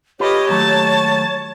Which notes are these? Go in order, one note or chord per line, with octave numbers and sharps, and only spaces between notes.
F4 G4 A4 B4 C#5 D#5
D#2 F#3 A3 A5